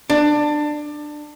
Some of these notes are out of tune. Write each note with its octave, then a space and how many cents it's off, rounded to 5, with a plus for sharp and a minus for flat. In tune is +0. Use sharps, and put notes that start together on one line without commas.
D4 +20